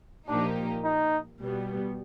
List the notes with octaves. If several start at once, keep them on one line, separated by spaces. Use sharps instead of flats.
A#2 F3 A#3 D4 D#4 G4
D#4
B2 G3 B3